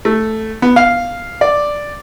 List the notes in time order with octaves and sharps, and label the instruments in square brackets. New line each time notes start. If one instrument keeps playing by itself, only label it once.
[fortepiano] A3
B3
F5
D5